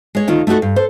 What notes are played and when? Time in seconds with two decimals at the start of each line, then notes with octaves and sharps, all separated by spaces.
0.15 G#3 C#5
0.28 D2 D#3 D#4 F4
0.47 A3 D#4 F4 F#4 A4
0.62 G2
0.76 A4 C5